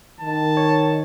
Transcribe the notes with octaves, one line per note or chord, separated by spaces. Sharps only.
D#3 A5
C#5